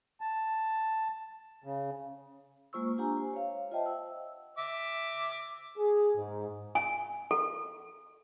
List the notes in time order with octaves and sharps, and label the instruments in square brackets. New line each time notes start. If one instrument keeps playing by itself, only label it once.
[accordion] A5
C#3
[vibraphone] G#3 A#3 F4 C5 C#6 E6
D4 F4 G4 F#5 G#5 A#5
C5
C#5 F5
F4 C5 D#5 E5 G5 A5
F#5 E6
[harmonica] E5 D6
[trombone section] G#4
G#2
[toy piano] G#5
A4